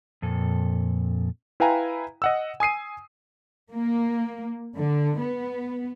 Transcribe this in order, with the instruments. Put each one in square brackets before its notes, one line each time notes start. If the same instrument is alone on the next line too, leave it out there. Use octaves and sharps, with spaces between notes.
[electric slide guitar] F2 A#2 A4
[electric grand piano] E4 B4 F5 G5 G#5 A#5
D#5 F#5 E6
G#5 D#6 C7 D#7
[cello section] A#3
D3
B3